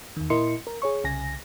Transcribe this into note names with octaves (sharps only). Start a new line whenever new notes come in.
E2 D#3
A#2 E4 A#4 D#5 C6 C#7
A#4
G#4 C#5 C#6
C2 C#3 G#5 A#6